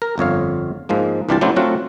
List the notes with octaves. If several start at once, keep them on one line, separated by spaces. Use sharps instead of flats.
A#4
G1 F2 C#5 F5
G#2 F3 G#3 A#3
C2 E3 D4 F4 G4 A5
F#3 A3 C#4 D4 E4 C5
F#3 A3 C4 F4 F#4 F#5